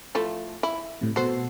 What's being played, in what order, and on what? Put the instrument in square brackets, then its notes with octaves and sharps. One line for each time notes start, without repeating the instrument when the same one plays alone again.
[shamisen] F3 A3 E4
E4
[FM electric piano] A2 C3
[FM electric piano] B2 A4 [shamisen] F#4 C5